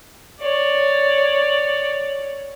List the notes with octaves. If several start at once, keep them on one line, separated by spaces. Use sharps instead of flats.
C#5 D5